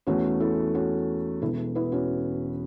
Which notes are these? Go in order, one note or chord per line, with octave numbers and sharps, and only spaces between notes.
E2 E3 A3 C#4 F#4
E4 A4
C#4 F#4
E1 E2 E3 E4 A4
B3 E4
C#4 F#4